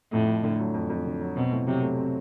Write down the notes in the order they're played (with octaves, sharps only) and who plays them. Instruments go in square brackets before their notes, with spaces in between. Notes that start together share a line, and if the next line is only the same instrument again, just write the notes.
[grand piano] F2 [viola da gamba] A2
[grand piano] F2
D3
F#3
F2
F2
D3
F#3
[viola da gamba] B2 [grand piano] C4
[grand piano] A2
[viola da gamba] C3 [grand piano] F#3
[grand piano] A3
C4